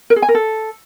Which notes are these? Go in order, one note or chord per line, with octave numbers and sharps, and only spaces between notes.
A#4
G#4
G#5
A#4
A4